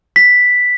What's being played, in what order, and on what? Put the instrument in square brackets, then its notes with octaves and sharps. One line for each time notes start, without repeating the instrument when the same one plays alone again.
[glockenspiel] B6